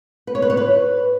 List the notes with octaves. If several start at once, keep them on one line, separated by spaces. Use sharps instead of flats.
B4
C#5
B4
C#5
B4